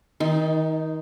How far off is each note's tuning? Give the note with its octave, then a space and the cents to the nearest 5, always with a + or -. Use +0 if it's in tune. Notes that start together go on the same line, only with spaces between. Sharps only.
D#3 +30 D#4 +0 C6 -20